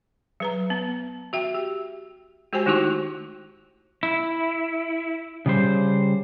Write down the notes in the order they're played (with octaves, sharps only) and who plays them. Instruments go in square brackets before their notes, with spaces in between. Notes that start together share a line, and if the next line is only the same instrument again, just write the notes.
[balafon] F#3 B4 A#5
B3
F#4 E5 G5
G4
G#3 F#4 G4 C5 G5 G#5
D#3 A3 D#4 E4 F#4 C#6
[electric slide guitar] E4
C#3 G3 C5